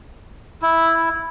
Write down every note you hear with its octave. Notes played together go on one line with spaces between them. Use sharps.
E4